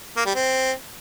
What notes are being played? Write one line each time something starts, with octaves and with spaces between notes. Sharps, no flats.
A#3
G3
C4